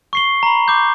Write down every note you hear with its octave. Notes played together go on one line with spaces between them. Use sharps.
C#6 C7 G7
A#5 B5
D6 G6